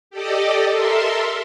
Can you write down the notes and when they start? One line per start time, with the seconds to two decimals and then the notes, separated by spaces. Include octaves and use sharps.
0.11 G4 A4 D5 D#5
0.71 A4 A#4 E5 C6